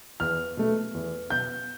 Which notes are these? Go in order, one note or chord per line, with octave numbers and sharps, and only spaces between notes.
E2 F6
B2 A3
E2
B2 G6